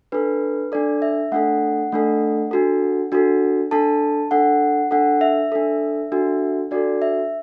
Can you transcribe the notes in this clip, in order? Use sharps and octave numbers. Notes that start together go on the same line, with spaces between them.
D4 A4 B4
D4 A4 D5
E5
A3 D4 A4 F#5
A3 D4 A4
D4 F#4 A4
D4 F#4 A4
D4 A4 A5
D4 A4 F#5
D4 A4 F#5
E5
D4 A4
D4 F#4 A4
D4 F#4 A4 D5
E5